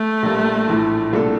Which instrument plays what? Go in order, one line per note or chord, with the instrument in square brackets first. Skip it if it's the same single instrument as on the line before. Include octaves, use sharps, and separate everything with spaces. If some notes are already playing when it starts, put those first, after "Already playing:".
Already playing: [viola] A3
[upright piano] A#1 A#2 G3 A#3
A#1 A2 E3
C2 A#2 A3 D4 A4